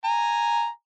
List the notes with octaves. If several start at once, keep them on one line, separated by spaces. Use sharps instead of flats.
G#5 A#5